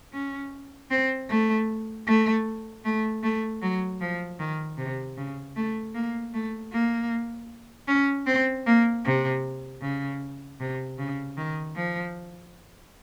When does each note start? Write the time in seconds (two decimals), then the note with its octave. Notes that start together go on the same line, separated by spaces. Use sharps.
0.13 C#4
0.91 C4
1.29 A3
2.07 A3
2.85 A3
3.23 A3
3.62 F#3
4.01 F3
4.39 D#3
4.78 C3
5.17 C#3
5.56 A3
5.95 A#3
6.34 A3
6.72 A#3
7.88 C#4
8.26 C4
8.66 A#3
9.05 C3
9.81 C#3
10.60 C3
10.98 C#3
11.37 D#3
11.76 F3